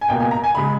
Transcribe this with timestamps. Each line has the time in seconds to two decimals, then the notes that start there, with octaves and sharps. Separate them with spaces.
0.01 G#5
0.09 C#2 B2 A#3 G5
0.20 G#5
0.31 A#5
0.44 G#5
0.55 C#3 G#3 B5